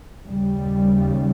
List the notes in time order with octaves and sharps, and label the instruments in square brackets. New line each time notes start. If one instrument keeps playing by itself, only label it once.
[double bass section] D#2 C#3 G3